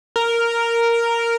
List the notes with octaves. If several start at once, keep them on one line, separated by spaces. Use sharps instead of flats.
A#4